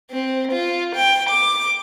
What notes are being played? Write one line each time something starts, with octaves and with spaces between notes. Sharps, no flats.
C4
F4
G5
D6